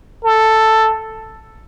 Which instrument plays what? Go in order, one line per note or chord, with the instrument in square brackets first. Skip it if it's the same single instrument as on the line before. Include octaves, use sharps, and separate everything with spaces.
[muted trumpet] A4